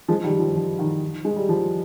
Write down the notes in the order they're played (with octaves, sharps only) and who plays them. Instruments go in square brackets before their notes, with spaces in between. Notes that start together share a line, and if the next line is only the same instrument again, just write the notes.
[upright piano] F3 G#3
D#3 G3
F3
F3
D#3
G#3
G3
F3